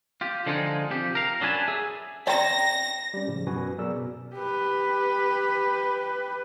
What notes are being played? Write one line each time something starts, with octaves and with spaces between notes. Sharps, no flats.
F4 G4
D3 F3 G#3 D#4 F4 G#4
C3 F3 G4
A#4 F5
F#2 F#3 D4 B4 G#5 A5
G#4 E5
D5 G5 A#5 A#6
G3 C#4
A2 C#3 F3
F#2 B2 F#4 B4 G#5
F#3 B3 G#4 A#4 D5 E6
B2
G4 B4